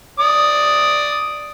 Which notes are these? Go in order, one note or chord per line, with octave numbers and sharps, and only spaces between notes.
D5 D#6